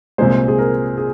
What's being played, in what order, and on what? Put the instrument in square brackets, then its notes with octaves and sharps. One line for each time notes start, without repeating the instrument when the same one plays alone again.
[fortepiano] C2 A#2 G#3 [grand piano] C5
[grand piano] G#4
A#4
G#4